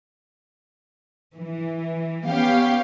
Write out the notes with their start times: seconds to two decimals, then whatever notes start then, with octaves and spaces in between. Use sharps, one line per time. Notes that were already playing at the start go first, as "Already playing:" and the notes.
1.37 E3
2.28 B3 C#4 G4 F5